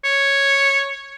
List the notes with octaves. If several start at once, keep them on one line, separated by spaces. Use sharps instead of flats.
C#5